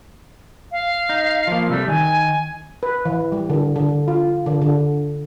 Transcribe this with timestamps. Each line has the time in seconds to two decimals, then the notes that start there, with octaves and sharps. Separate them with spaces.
0.72 F5
1.09 D#4
1.47 F3 A#3
1.70 C3 G3 A3 E6
1.88 D#3 G#5
2.83 B4
3.05 E3
3.32 G3
3.50 D3
3.76 D3
4.08 F4
4.46 D3
4.62 D3